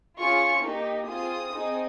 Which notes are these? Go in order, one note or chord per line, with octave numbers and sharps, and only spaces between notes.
C#4 F4 G#4 C#6
A#3 D#4 G4
C4 F4 G#4 D#6
C4 D#4 G#4